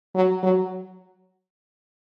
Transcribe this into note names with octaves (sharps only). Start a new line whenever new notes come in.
F#3
F#3